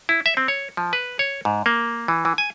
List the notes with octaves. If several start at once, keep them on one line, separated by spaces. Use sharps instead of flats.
E4
E5
C4
C#5
F3
B4
C#5
G#2
A#3
E3
E3
G#5